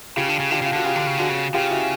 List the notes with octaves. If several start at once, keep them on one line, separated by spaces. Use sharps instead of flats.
C#3 F4 G4
D3
C#3
D3 F4 G4
C#3 F4
D3 F#4
C#3 F4 G4
D3
C#3
D3 F#4 G#4
C#3
C#3 F4 G4
E4 F#4